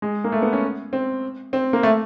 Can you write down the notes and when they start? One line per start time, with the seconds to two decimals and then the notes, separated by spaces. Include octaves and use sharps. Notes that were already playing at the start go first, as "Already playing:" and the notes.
0.02 G#3
0.24 A#3
0.32 A3
0.42 B3
0.53 C#4
0.93 C4
1.53 C4
1.73 A#3
1.83 A3